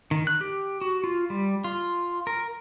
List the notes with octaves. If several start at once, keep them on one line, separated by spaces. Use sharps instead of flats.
D#3
F#6
G4
F#4
F4
G3
F4
A#4